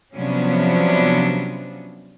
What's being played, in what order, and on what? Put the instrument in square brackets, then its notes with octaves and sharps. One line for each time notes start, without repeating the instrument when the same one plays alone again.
[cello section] C3 F3 F#3 B3 C#4 D4